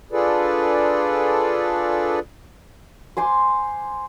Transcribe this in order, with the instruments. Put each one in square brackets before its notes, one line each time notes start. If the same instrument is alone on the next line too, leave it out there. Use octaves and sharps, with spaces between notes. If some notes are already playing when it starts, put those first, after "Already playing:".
[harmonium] D4 F4 G#4 A4 B4 D5
[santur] C5 G#5 C6 D6